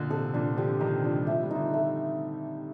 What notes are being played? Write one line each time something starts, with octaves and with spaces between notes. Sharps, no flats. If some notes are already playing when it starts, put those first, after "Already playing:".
Already playing: A#2 D3 D#5
C3 A4
A#2 D3 D4
D3 F3 G4
C3 D#3 C5
F3 D4
G3
F3 A3
G3
D3 F3 D#4
A3